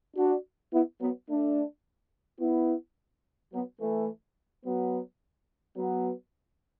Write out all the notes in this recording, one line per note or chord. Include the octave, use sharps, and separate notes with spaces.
D4 F#4
B3 E4
F#3 B3
A3 D4
B3 E4
F#3 B3
E3 A3
F#3 B3
F#3 B3